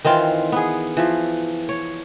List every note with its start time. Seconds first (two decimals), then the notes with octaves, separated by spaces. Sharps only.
0.05 D#3 E3 C4 F4
0.52 B3 G#4
0.97 E3 F3
1.69 C#5